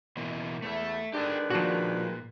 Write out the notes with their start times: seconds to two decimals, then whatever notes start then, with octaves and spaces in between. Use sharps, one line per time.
0.17 B2 E3 A#3
0.62 E2 A3 E5
1.14 D#3 G#3 D4 G4 A4 B4
1.50 A#2 F3 D4 F#4